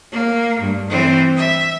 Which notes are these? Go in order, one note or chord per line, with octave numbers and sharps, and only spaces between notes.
A#3
G2
E3 C4
E5